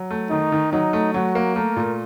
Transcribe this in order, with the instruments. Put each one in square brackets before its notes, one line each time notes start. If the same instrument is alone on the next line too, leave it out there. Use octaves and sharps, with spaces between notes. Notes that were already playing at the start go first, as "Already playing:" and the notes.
Already playing: [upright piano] F#3
A3
[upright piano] D#3 [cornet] D#4
[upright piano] D#3
[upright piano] F#3 [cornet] D#4
[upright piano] A3
[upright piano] F#3 [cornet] F#4
[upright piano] A#3
[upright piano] A3 [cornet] A#4
[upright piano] A#2